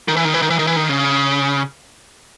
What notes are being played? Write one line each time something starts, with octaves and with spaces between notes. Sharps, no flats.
D#3
E3
D#3
E3
D#3
E3
D#3
E3
D#3
C#3